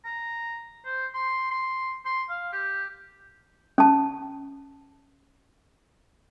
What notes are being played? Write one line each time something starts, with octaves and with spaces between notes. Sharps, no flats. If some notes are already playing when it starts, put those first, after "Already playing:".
A#5
C5
C6
C6
C6
F5
G4
C#4 A5